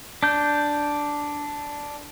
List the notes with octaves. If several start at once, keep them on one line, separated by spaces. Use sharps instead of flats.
D4 G6